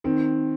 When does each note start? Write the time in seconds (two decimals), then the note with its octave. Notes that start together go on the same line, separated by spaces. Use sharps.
0.04 D#3 C4